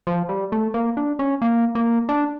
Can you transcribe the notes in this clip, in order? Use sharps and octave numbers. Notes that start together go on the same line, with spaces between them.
F3
G3
A3
A#3
D4
C#4
A#3
A#3
D4